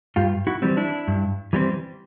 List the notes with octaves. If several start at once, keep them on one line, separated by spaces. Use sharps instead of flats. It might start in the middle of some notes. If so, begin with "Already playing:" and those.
G2 F4 G4
E4 F#4
E3 G3 C4
D4 E4
G2
E3 G3 C4